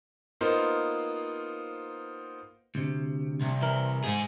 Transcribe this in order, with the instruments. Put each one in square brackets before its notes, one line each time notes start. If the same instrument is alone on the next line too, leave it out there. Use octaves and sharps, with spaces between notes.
[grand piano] A#3 B3 D#4 F4 C5
[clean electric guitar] D2 C3
[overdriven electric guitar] C2
[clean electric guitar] E3 A#4
[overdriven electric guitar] G#2 G#4